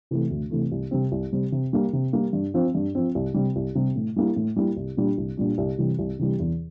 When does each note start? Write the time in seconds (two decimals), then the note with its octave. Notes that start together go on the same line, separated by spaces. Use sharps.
0.11 C3 E3 A3
0.31 D2
0.51 C3 E3 A3
0.72 C2
0.91 C3 G3 C4
1.12 C2
1.33 C3 G3 C4
1.52 C3
1.73 G3 A#3
1.93 C3
2.13 G3 A#3
2.33 G2
2.54 F3 C4
2.75 G2
2.95 F3 C4
3.15 C2
3.34 C3 G3
3.56 C2
3.75 C3 G3
3.96 A2
4.16 G3 A#3 E4
4.36 A2
4.56 G3 A#3 E4
4.77 C2
4.97 A#2 G3 D4
5.18 C2
5.37 A#2 G3 D4
5.58 C2
5.78 C3 E3 G3
5.99 C2
6.19 C3 E3 G3
6.39 E2